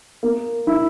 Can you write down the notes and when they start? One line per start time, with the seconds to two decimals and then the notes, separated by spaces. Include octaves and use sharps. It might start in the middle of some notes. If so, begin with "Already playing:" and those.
0.23 A#3
0.67 E4